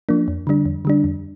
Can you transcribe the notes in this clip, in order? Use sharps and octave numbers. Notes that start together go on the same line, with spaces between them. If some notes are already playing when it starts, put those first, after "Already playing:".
F3 A#3 D4
F2
D3 G3 D4
F2
D3 G3 D4
F2